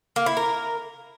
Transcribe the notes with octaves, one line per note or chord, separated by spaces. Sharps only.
A#3
E4
A#4